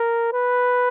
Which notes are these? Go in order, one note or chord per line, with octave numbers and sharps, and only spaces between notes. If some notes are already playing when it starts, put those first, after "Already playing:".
Already playing: A#4
B4